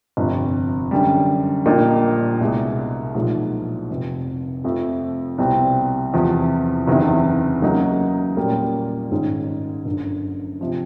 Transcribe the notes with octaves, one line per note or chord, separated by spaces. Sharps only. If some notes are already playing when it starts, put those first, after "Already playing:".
G1 F2 C3
F#2 D3 G3
A#1 A#2 G3 A#3 D#4
C2 B2 G#3
B1 A#2 F3 G#3
F1 F2 C3
F1 F2 C3 F3 A3
C2 B2 G3 C4
E2 C3 F3
F#1 E2 C3 D#3
C#3 F#3 A#3 D#4 F#4
A#2 G3 A#3 C#4 F4
G#1 G#2 D#3 G#3 C#4
G1 F#2 D3
C3 F3